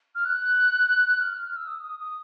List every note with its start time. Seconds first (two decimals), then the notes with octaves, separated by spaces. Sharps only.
0.15 F6
0.25 F#6
1.20 F6
1.33 F6
1.44 F6
1.56 E6
1.68 D#6
1.83 D#6
1.99 D#6